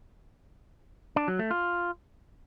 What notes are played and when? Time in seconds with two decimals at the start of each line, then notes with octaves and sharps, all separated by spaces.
1.16 D4
1.28 F#3
1.39 A3
1.51 F4